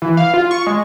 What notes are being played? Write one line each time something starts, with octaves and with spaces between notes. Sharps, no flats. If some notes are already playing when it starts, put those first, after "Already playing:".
E3
F5
F4
C#6
G#3